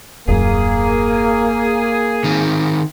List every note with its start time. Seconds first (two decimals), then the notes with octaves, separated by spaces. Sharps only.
0.28 D#1 F#2 A#3 G#4
2.24 D#3 C4